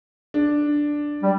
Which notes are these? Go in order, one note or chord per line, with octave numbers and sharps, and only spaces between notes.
D4
G3